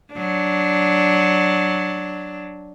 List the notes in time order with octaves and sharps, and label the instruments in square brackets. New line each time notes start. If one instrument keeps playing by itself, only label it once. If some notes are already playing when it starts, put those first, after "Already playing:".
[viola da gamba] F#3 D4